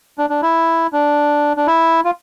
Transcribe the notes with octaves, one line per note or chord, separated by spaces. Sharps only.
D4
D4
E4
D4
D4
E4
F4